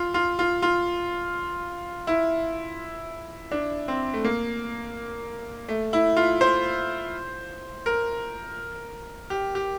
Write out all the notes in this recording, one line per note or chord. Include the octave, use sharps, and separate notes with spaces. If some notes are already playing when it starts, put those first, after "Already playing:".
Already playing: F4
F4
F4
F4
E4
D4
C4
A3
A#3
A3
E4
F4
C5
A#4
G4
G4